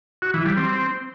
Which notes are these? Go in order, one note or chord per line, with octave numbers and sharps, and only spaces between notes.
F#4
E3
G3
C4